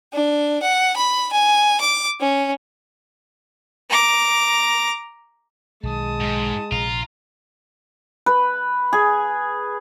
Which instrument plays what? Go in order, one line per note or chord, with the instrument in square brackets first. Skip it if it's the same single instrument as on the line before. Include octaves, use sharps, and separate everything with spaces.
[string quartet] D4
F#5
B5
G#5
D6
C#4
[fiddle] A#5 D6
[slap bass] B1 D#3 [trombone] G#3 [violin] A5 D#6
[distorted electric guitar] G#2
[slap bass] A#1 C3 [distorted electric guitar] F4 [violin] A#5
[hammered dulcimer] B4
G#4